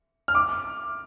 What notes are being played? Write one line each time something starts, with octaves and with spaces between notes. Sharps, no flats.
F6
D6